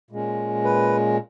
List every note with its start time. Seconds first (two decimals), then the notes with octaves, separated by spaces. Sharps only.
0.11 A#2 G#3 C#4
0.64 B4